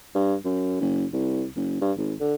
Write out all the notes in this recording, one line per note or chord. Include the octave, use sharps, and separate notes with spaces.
G2
F#2
F#1
C2
F#1
G2
G#1
D3